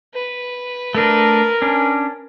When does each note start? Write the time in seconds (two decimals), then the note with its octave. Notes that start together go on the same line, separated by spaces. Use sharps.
0.14 B4
0.95 A3 D4 A#4
1.62 C#4 D4